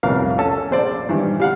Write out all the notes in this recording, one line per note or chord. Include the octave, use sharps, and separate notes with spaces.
C2 F2 A2 B3 A#4 F5
C#4 A4
A#1 C5 D5
G2 D#3 E3
G3 F5 F#5